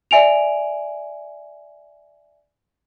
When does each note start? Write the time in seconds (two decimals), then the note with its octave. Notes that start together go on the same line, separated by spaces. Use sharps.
0.11 D5 E5 G#5 D7 F7